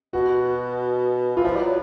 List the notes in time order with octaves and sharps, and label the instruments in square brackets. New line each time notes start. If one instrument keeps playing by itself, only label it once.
[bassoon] B2 [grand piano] F#4
[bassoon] E3 [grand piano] F4
[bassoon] F3 [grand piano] E4
[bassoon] G3
F#3